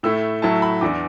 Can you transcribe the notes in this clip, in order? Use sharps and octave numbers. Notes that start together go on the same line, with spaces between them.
A2 A3 E4 E6
A2 F#3 A3 E4 A5
B5
E2 E3 D4 D6